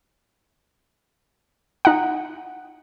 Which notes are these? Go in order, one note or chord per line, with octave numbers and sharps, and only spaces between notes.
D#4 F#5